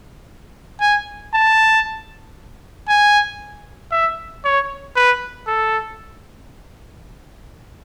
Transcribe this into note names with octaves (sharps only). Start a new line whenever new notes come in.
G#5
A5
G#5
E5
C#5
B4
A4